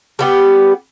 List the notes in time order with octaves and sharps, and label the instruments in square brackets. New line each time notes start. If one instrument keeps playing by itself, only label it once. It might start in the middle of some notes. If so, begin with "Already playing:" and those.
[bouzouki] G3 B3 G4